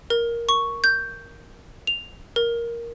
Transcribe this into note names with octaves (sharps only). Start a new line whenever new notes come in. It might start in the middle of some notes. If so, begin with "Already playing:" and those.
A#4
C#6
G6
F7
A#4